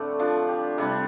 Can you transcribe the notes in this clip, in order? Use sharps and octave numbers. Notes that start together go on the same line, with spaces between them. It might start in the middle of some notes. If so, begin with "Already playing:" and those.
Already playing: A2 D3 A3 C4 D5
F3 D4
G4
C3 G3 D4 D5